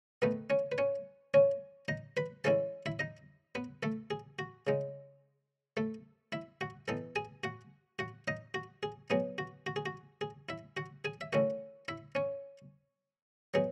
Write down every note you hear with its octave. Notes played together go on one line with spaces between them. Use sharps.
D#3 A3 B3 D#4 B4
C#4 C#5
B4
C#4 C#5
C#4 C#5
D#4 D#5
B4 B5
E3 G#3 C#4 E4 A4 A5
E4 E5
D#4 D#5
B3 B4
A3 A4
G#4
F#4
C#3 G#3 D#4
A3 A4
E4 E5
F#4 F#5
E3 B3 D#4 A4 A5
G#4 G#5
F#4 F#5
F#4 F#5
D#4 D#5
F#4
G#4
B2 F#3 B3 D#4 G#4
F#4
F#4
G#4
F#4
G#4
E4 E5
F#4 F#5
G#4 G#5
E5
D#3 A3 C#4 E4 F#4 F#5
E4 E5
C#4 C#5
F#3 B3 D#4 G#4